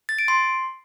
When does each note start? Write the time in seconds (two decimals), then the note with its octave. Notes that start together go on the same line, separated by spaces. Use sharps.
0.09 A6
0.19 D7
0.28 C6